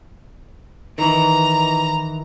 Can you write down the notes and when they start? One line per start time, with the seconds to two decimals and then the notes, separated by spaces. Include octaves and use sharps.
0.98 D#3 E3 A#5